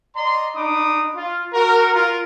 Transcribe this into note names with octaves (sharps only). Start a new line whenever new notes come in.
D5 D#5 A#5 C6
D4 D#4 B5 D6 D#6
F4
F#4 A#4
F4 A#4